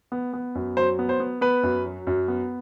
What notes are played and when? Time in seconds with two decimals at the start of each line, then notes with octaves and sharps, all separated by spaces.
0.12 B3
0.33 B3
0.55 F#2
0.77 F#3 C5
0.99 B3
1.09 C5
1.20 B3
1.41 B3 B4
1.63 F#2
1.85 F#3
2.07 F#2
2.28 B3